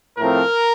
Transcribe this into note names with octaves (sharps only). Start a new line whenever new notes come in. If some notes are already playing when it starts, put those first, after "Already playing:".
A2 F3 A3 C4 A#4